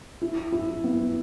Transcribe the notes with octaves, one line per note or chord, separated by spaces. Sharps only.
E4
E4
B3